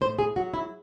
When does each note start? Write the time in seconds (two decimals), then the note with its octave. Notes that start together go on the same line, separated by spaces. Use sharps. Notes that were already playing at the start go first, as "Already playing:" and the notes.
0.01 A2 C5
0.19 G#4
0.36 F#3 F#4
0.54 E4